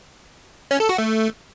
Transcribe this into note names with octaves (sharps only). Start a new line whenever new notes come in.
C#4
A4
F#4
A3